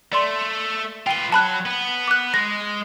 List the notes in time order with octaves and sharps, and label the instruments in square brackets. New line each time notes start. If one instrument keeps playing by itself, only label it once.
[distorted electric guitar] A3 [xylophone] D5 C6
[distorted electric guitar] F4 B4 [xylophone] G5 G7
[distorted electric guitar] F#3 [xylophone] A5 B5 F#6
[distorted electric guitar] B3
[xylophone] D6 F#6
[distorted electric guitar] G#3 [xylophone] A#6